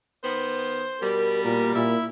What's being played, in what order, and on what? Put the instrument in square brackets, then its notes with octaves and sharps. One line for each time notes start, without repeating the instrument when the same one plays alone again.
[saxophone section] D#3 B3 [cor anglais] C5
[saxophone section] B2 G3 [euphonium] A#4
[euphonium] A#2 [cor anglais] A#4
[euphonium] A#2 [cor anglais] E4